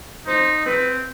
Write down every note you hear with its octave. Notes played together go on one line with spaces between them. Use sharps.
D#4 C5
C4 B4